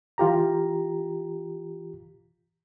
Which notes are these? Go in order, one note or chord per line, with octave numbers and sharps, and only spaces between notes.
E3 F4 G4 A#5